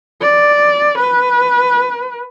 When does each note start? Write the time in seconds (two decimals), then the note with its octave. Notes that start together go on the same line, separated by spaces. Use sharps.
0.22 D5
0.98 B4